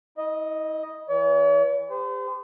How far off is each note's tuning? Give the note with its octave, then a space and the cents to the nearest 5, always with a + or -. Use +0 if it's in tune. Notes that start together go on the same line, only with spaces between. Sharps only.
E4 -45 D#5 +0
E3 +0 C#5 +45
G4 +30 C5 -40